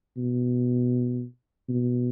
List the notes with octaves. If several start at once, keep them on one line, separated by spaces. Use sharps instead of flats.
B2
B2